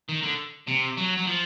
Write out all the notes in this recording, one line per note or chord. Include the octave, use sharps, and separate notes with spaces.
D#3
D3
C3
F#3
F#3
F3